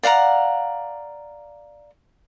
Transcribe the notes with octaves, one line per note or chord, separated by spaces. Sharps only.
D5 F5 F#5 A#5